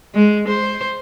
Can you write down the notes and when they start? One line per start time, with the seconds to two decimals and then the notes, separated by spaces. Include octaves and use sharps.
0.15 G#3
0.48 C5